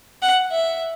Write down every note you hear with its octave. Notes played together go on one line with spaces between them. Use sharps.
F#5
E5